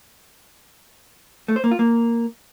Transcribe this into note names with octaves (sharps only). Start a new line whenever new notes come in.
A3
C5
A#3
F4
A#3